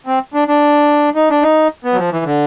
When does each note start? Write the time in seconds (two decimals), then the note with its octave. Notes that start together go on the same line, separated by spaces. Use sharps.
0.07 C4
0.34 D4
0.48 D4
1.15 D#4
1.30 D4
1.43 D#4
1.85 B3
1.93 F#3
1.98 F3
2.12 E3
2.25 D3